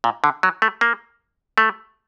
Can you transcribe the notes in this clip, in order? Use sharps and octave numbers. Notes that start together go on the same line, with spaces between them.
A#2
D3
F#3
A3
A#3
A3